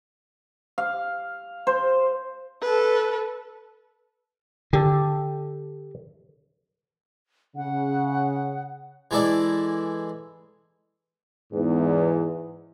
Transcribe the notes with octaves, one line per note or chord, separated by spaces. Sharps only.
F5
C5
A4 B4
D3 G4 A4
C#3 F#5
E3 G#3 E4 A4 D5
E2 G#2